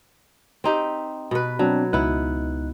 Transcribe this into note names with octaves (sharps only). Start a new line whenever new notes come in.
C4 D#4 G4
B2 B4
F#3 C4 D4
C#2 B3 D#4 E4 F#6